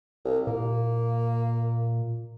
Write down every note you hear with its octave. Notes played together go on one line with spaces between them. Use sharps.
C2
A#2 A#3